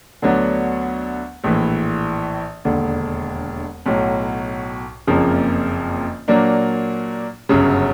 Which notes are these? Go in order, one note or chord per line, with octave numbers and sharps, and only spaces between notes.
D2 D3 F#3 B3 D4
A#1 A2 E3
E1 D#2 D3
B1 A2 F#3
F#1 F2 C#3 F3 A#3
A#2 F#3 A#3 D4
G1 F#2 C#3 F#3